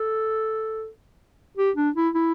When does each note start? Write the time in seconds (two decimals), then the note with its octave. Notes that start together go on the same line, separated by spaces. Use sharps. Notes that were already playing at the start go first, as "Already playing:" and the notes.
Already playing: A4
1.58 G4
1.76 D4
1.96 E4
2.14 E4